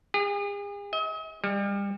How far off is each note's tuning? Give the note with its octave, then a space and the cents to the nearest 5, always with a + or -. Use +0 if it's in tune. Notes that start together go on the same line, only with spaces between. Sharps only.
G#4 -40
D#5 +45
G3 +35